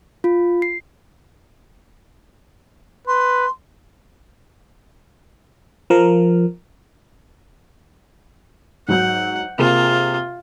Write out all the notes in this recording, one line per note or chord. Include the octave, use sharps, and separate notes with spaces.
F4
C7
B4 C6
F3 A#4
G#2 F#3 F#5 G6
C3 A#3 F4 G#4